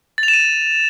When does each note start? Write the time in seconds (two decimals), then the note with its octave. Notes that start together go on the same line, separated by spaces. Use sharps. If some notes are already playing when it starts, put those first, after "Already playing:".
0.18 A6
0.23 F7
0.28 E7
0.33 D#7